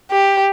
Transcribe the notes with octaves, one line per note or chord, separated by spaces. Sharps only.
G4